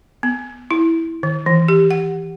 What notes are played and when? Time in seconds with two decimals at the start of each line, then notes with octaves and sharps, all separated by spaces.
0.23 B3
0.71 E4
1.23 D#3
1.46 E3
1.68 G4
1.91 F#5